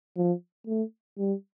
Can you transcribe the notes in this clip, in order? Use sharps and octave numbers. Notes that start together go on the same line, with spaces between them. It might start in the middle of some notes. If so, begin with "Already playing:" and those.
F3
A3
G3